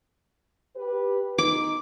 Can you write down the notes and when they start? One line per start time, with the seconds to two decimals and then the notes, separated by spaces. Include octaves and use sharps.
0.76 G4 B4
1.38 D#4 D6